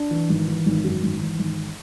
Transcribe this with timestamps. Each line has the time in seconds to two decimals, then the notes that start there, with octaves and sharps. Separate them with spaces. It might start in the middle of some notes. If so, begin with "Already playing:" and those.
Already playing: D4
0.11 E3
0.30 G#1
0.48 E3
0.66 G#1
0.84 F#2
1.03 G#1
1.21 E3
1.39 G#1